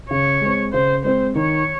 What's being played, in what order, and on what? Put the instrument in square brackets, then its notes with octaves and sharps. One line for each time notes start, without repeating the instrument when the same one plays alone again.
[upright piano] C#3 [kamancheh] C#5
[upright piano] G#3 C4
[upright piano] C#3 [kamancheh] C5
[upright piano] G#3 C4 [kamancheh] C5
[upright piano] D#3 [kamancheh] C#5